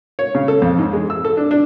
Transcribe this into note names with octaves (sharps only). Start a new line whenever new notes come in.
C#5
C#3
A4
F2
G#2
G#3
E6
A4
D4
D4